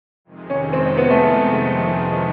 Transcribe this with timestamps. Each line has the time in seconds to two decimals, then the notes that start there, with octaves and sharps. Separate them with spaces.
0.25 F2 C3 D#3 G#3
0.50 C#4
0.73 C4
0.97 B3
1.10 A3